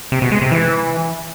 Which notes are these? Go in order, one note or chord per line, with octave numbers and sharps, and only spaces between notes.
C3
B2
G#3
C3
E3